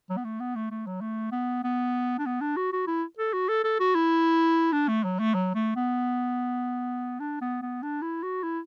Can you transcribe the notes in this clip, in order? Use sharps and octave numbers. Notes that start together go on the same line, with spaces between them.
F#3
B3
A3
B3
A3
A3
F#3
A3
B3
B3
D4
B3
D4
F#4
F#4
E4
A4
F#4
A4
A4
F#4
E4
D4
A3
F#3
A3
F#3
A3
B3
D4
B3
B3
D4
E4
F#4
E4